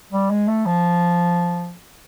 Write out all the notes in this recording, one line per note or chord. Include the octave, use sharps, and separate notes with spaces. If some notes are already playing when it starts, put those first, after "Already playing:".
G3
G#3
A3
F3